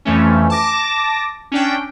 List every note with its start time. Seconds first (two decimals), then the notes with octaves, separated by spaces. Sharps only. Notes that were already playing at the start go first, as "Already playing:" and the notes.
0.05 F2 E3 A3 C#4
0.50 A5 D6 A#6
1.52 C#4 D4 G5